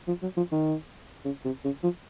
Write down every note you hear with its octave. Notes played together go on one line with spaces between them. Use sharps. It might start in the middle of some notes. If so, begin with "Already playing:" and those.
F3
F#3
F3
D#3
C#3
C3
C#3
F3